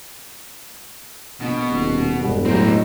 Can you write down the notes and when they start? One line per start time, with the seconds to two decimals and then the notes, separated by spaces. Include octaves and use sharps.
1.40 A#1 B2
1.69 D#1
2.21 E1 G2
2.45 A2 F#3 C4 D#4